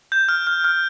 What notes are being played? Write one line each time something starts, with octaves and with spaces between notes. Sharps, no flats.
G6
F6
F6
F6